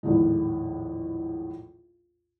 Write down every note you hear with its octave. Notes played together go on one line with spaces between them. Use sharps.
A#1 E2 A2 D#3 E3 G#3